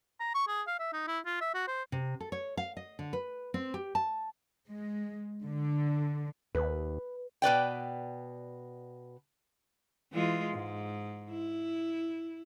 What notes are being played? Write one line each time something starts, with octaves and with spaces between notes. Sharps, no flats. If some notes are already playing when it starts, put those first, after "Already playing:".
A#5
C#6
G#4
F5
E5
D#4
E4
F4
E5
F#4
C5
C3
A4
C#5
F5
D#5
D3
B4
C4
G4
A5
G#3
D3
D#2 B4
B2 B4 D5 G5
E3 G#3 F4
G#2
E4